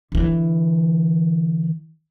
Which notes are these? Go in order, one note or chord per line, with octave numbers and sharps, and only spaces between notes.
D3 E3